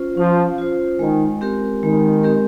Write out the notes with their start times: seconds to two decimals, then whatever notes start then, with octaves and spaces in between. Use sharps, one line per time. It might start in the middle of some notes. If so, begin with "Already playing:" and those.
Already playing: C#4 F4 C5
0.17 F3 C#4
0.58 F4 C5
0.99 D#3 G#3
1.41 C4 G4 A#4
1.83 D#3 G#3
2.24 C4 G4 A#4